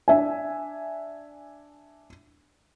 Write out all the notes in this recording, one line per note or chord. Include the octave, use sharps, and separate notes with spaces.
D4 E5 G#5